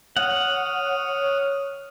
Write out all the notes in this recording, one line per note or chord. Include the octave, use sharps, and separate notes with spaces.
C#5 F#5 D#6 F6